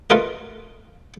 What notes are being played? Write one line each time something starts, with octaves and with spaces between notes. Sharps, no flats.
A3 F4 A#4 B4 D#5